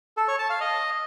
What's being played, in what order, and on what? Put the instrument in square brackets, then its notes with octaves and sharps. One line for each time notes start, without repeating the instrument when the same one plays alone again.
[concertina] A4
C#5
A5
F5
D#5